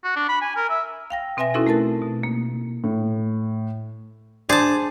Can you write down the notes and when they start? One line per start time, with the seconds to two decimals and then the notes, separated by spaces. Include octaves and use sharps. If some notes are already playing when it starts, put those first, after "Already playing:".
0.04 F#4
0.16 D4
0.29 B5
0.41 G#5
0.56 A#4
0.70 E5
1.10 F5 G5 A#6
1.37 B2 C4 B4 E5 G#5 A#6
1.54 C4 C#4 D#4 E4 F#4 A4
1.67 A3 A#4 A5 A6
2.02 B2
2.23 A#3
2.84 A2
4.49 D4 G#4 C5 D5 A5